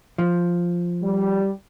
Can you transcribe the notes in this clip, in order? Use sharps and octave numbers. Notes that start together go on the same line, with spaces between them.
F3
G3